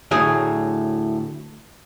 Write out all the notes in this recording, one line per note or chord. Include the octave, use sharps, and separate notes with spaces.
D2 A2 F#3 G#4